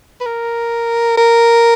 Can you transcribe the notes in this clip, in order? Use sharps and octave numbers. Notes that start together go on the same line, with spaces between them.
B4
A#4
A#4